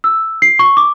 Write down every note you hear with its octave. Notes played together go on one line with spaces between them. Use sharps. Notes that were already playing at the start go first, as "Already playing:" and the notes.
E6
C7
C#6
D6